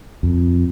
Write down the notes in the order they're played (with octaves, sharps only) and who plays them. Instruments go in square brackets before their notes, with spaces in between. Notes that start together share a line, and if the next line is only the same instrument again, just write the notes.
[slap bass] F2